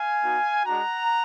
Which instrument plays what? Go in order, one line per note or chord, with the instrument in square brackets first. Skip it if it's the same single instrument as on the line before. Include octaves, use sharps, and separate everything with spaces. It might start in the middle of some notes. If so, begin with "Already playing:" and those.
Already playing: [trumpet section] F5 G#5
B3 D#4 F#4
G#3 D4 F#4 F#5 A#5